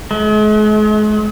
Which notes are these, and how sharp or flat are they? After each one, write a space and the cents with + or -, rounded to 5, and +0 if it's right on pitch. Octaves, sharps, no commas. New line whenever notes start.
G#3 +40